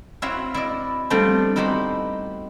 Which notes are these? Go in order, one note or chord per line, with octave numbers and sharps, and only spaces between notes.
C4 E4 F#4 C#5 E5 F5
E4 D5 D#5
F3 G3 A3 B3 C4 D4
D#4 E4 F#4 G4 B4 C5